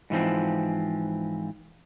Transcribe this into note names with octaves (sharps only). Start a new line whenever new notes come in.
G#2 E3 F3 C4